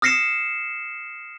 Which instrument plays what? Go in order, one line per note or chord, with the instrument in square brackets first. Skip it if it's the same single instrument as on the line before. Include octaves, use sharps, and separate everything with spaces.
[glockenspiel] D#6 F6 A#6 C7 C#7 E7